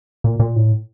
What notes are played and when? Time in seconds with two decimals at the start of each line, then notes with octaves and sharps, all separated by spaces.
0.24 A#2
0.40 A#2
0.56 A2